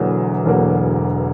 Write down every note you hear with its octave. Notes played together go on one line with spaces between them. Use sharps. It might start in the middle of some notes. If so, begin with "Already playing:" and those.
Already playing: E1 E2 D3 F#3 A#3
E1 E2 D3 F#3 A#3